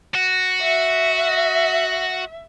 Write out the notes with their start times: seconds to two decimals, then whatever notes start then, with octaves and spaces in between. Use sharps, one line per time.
0.15 F#4
0.62 E5